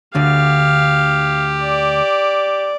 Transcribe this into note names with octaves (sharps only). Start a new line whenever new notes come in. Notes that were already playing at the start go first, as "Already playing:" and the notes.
D2 D3 G4 F5
D5